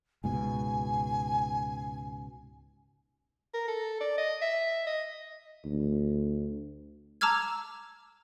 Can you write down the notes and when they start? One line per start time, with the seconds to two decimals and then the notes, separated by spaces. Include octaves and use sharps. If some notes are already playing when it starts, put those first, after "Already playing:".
0.24 C#2 G#2 B2 G#5
3.54 A#4
3.68 A4
4.01 D5
4.18 D#5
4.42 E5
4.87 D#5
5.65 D2
7.21 A5 A#5 D6 E6 F6 G#6